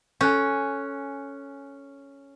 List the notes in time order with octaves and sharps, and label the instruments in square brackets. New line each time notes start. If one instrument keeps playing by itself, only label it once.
[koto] C#4 [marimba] A4 [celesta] G#5 F#6 G6